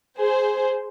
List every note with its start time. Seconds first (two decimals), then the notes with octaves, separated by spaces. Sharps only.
0.16 G#4 C5